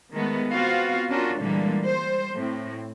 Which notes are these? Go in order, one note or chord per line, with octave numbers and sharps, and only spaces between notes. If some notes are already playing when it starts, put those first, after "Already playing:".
D#3 G#3 A3 B3
B3 C4 F4 F#4 F5
C#4 D4 F4 F#4 A#4
A#2 D3 E3 G3 G#3 A#3
G3 C5
A2 C4